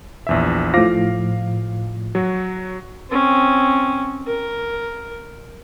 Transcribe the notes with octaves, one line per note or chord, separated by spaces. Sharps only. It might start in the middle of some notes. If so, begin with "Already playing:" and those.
A#1 E2 E5
A2 F3 F5 D6 A#6
F#3 F#4
C4 C#4
A#4